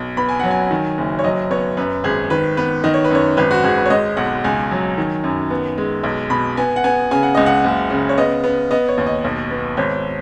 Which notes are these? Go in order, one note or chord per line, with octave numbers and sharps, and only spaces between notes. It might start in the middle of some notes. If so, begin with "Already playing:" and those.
Already playing: B1
B3 B5
G#5
F#3 F#5
G#5
D#3
F#1
C#5
F#3 D#5
B3 C#5
F#2 B4
G#1 G#4
D#3 B4
B3 B4
D#3 D#5
C#5
B4
F#2 C#5
G#1 B4
F#4
G#1 G#4
B4
C#5
G#3 D#5
B1 F#5
C#2 G#5
F#3
D#3
F#2
B3
G#3
B1
B2 B5
B3 G#5
F#5
B3 G#5
C#3 G#5
F#5
C#2 D#5
F#5
F#1
C#3
C#5
B3 D#5
B3
B3 D#5
C#5
D#2
D#5
B1
B3
G#1 C#5